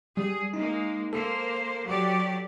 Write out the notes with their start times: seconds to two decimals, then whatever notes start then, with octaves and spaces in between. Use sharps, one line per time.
0.17 G3 G#4
0.54 G#3 A#3 D#4
1.13 A#3 A4 C5
1.86 F#3 G4 D5